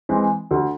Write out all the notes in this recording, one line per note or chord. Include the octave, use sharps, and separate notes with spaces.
E3 G#3 C4
D2